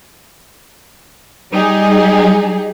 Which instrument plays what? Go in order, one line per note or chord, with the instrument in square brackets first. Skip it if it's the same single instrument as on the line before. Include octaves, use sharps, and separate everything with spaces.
[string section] G3 D#4 G4 G#4